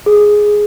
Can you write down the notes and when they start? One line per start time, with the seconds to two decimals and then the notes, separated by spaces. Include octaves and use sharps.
0.06 G#4